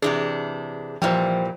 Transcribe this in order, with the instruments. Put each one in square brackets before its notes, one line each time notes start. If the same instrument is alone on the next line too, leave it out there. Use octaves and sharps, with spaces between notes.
[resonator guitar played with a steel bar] C3 E3 D4 [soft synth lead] G#4
[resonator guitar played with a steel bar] A#2 E3 G3 [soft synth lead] F3 [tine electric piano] C5 G5